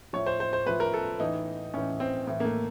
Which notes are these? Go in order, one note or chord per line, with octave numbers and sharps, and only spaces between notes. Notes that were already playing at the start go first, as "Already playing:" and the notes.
A2 F3 C#5
C5
C5
C5
A2 F3 B4
A#4
A4
A2 E3 D#4
A2 E3 C#4
C4
A2 E3
A#3
A3